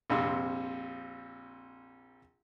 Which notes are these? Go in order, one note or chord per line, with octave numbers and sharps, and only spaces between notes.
A#1 F2 C3